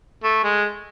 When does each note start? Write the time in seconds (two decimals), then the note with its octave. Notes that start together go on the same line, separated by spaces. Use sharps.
0.24 A3
0.43 G#3